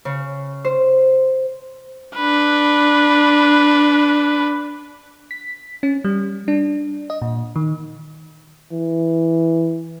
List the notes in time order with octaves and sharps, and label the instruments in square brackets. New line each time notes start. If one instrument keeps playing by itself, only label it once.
[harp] C#3
C5
[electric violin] D4 B4
[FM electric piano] B6
C#4
G3
D4
D#5
A#2
D#3
[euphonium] E3